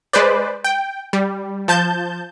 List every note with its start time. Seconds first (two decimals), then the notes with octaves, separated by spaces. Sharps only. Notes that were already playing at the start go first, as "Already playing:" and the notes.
0.13 G#3 B4 C5 D5
0.64 G5
1.13 G3
1.68 F3 A5 G6